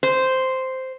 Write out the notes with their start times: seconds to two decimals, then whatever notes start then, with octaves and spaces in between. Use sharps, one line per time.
0.03 C5